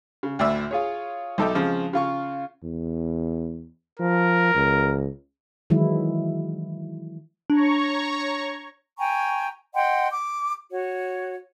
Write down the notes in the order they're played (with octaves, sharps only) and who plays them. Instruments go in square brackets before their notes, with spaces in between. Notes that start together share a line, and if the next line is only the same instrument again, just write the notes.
[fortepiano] C#3
D2 A2 D5 E5
F4 G#4 C#5
B1 D#4 A4 E5 G5 D6
C#3 F3 G#3 C4
C#3 F4 C#6
[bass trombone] E2
[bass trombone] F3 [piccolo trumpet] A#4
[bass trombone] C#2
[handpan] D#3 E3 F#3 G#3 E4
[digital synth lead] D4 [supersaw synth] C#5 A#5 C#6
[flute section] G5 G#5 A#5 C#6
D#5 F#5 G5 C6
D6
F#4 C#5